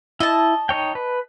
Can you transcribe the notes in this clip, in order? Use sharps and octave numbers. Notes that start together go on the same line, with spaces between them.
E4 D#5 A5
D#4 C#5 G5
B4